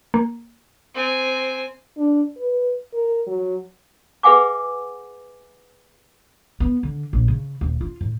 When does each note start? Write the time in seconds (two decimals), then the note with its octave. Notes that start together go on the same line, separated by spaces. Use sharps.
0.14 A#3
0.94 C4 G#5
1.98 D4
2.37 B4
2.94 A#4
3.27 F#3
4.23 G#4 B4 E5 F#5 G#5 D6
6.60 B3
6.83 D3
7.13 A#1
7.28 C#3
7.61 D#1
7.81 F4
8.01 A2